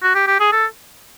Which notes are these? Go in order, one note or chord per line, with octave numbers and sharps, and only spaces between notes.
F#4
G4
G4
G#4
A4